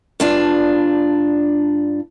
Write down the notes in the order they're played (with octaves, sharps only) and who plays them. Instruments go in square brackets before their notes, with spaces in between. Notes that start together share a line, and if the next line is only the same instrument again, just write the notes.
[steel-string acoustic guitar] G2 D4 F4